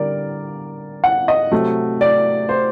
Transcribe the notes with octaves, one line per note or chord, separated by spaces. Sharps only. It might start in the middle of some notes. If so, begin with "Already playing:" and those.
Already playing: D3 G3 A#4 D5
F#5
D#5
C3 F#3 A3
D5
C5